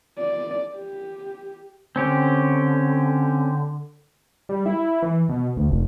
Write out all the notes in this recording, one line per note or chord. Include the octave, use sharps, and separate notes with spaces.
D5
G4
D3 C4 C#4 G4
G3
E4
E3
B2
D2
F1